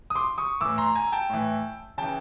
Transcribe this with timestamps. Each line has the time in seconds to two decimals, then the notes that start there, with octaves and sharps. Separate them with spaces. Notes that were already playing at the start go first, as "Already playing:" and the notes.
0.10 D#6
0.16 C6 D6
0.38 C#6 D#6
0.61 A2 E3 D6 E6
0.78 A#5 C6
0.95 G#5 A#5
1.12 G5 A5
1.30 A2 E3
1.98 C#3 E3 G5 A5